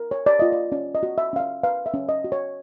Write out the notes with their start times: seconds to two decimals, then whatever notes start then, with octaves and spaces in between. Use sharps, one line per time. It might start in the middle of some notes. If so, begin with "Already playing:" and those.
Already playing: A#4
0.11 C#5
0.26 D5
0.39 F4 D#5
0.52 D5
0.72 C#4 D5
0.95 D#5
1.03 F#4
1.18 E5
1.33 C#4 F5
1.40 E5
1.64 B4 F5
1.86 E5
1.94 C#4
2.09 D#5
2.24 F#4
2.32 C#5